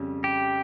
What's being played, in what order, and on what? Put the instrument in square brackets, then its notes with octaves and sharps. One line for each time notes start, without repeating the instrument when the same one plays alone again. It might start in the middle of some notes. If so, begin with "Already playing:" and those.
Already playing: [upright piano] F2 C#3 G3 C#4
[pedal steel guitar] G4